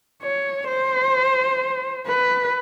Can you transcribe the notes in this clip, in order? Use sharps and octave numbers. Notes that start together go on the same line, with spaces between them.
C#5
C5
B4